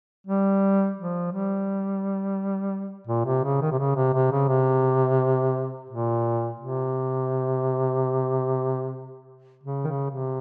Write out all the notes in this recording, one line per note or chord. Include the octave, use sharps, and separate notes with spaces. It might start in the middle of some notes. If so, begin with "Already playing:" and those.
G3
F3
G3
A#2
C3
C#3
D#3
C3
C#3
C3
C3
C#3
C3
A#2
C3
C#3
D#3
C#3
C3